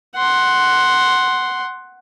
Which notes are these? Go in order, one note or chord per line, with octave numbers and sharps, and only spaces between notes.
F#5 C6